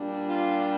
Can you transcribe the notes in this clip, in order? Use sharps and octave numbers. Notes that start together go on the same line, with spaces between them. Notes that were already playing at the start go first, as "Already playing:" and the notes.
Already playing: A#2 G3 D4
F4